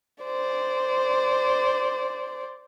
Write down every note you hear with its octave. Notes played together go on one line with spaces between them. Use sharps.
C5 D5